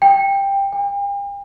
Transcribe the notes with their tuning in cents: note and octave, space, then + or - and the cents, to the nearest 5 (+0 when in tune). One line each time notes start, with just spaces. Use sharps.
G5 +10
G5 +40